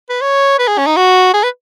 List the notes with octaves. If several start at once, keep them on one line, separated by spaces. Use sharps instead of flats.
B4
C#5
B4
G#4
C#4
D#4
F#4
G#4
B4